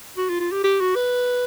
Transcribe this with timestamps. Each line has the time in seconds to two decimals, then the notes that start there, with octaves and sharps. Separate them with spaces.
0.17 F#4
0.29 F4
0.40 F4
0.52 G4
0.64 G4
0.81 F#4
0.96 B4